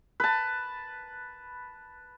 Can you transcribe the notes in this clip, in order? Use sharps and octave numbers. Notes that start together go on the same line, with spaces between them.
B4 A5